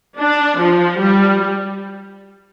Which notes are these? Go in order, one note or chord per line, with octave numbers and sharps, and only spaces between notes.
D4
F3
G3